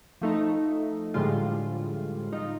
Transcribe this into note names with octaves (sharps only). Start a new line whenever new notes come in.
F3 A3 D#4
A2 D3 F3 G3 G#3 F4
D#4 F4